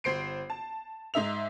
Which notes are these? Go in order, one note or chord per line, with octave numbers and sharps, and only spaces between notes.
G1 C5 C7 D7
A5
G#2 D#4 E5 F7